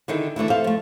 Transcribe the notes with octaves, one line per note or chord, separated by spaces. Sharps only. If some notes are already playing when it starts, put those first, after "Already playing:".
D3 D#3 D#4 E4 G#4
E3 A3 D4 E4
A4 C5 E5 F5
F3 A3